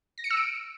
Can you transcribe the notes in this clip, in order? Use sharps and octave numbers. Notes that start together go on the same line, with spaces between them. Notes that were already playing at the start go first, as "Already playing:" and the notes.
A#6
C#7
E6
D7